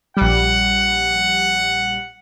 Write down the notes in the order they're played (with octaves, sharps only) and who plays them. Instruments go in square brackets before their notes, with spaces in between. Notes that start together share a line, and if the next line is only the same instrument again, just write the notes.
[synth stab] A#1 G3 [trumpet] F#5